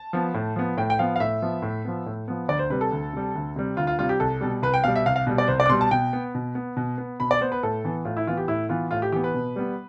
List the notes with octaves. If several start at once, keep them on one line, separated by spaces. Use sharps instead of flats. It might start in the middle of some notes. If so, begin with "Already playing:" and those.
Already playing: A5
F3 B3
A2
F3 B3
A2 G5
G5
F3 B3 F5
F5
A2 E5
F3 B3
A2
F3 B3
A2
F3 B3
D2 D5
C5
C3 G3 B4
A4
D2
C3 G3
D2
C3 G3
D2 F4
F4
C3 G3 F4
G4
C2 A4
B2 G3
C2 B4
G5
B2 G3 F5
E5
C2 F5
F5
B2 G3
D5
C2 C5
D5
D6
B2 G3 C6
A5
B2 G5
B3
B2
B3
B2
B3
B2 B5
D5
B3 C5
B4
A2 A4
E3 B3
A2 F4
E4
E3 B3 F4
G4
A2 E4
E3 B3 F4
A2 F4
G4
E3 B3 G4
B4
B2
G3 B3